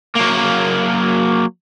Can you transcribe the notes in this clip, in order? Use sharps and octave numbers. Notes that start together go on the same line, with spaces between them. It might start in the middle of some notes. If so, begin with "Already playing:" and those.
F#3 A#3